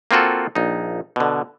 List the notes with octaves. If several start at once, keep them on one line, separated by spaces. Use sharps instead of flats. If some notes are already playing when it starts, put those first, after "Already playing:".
A#3 C4 F4 F#4 A4
A#1 D#4
B2 D3